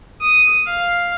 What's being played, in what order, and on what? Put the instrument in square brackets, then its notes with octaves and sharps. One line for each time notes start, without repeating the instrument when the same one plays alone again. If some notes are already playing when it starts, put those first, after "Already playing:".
[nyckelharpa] D#6
F5